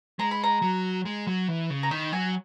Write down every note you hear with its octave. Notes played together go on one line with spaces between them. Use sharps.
G#3 A#5
B5
A#5
F#3
G#3
F#3
E3
C#3
A#5
D#3 B5
F#3 G#5